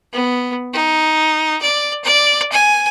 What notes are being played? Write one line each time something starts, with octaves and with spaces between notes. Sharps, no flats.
B3
D#4
D5
D5
G#5